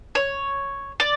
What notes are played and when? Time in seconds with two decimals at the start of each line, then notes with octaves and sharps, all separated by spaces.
0.15 C#5
1.00 D5